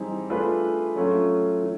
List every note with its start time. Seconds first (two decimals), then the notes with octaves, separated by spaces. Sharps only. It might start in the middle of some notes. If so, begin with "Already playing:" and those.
Already playing: E3 G3 C4 D#4 G#4
0.30 A3 D4 F4 G#4 B4
0.95 F#3 A3 C#4 F4
1.62 E3